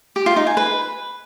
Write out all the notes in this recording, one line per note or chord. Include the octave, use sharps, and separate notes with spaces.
G4
F4
D#4
G#5
B4